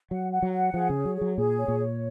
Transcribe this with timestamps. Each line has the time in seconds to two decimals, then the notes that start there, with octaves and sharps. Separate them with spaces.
0.11 F#3 F#5
0.32 F#5
0.43 F#3
0.54 F#5
0.73 F3 G#4
0.89 C#3
0.96 C#5
1.05 F#3
1.16 G#4
1.21 F#3
1.37 A#2 G#4
1.58 C#5
1.68 A#2
1.79 C#5